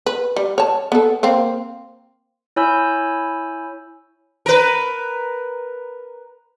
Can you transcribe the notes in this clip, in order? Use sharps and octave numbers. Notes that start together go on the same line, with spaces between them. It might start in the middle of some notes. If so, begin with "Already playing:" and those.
B4
G3
C#5 A5
B3 A4
A#3 C4 F5
E4 C#5 G#5 B5 E6 G6
A#4 B4